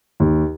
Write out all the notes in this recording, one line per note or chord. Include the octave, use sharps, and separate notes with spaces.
D#2